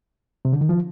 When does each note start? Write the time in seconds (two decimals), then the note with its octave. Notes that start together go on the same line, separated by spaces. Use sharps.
0.45 C3
0.53 D3
0.61 D#3
0.69 F3